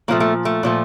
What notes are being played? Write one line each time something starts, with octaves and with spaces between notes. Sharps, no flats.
A#2 F3 A3 A#3
A3
A3
A#2 F3 A3